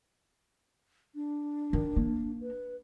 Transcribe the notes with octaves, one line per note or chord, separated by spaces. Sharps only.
D4
D#3
A#3
B4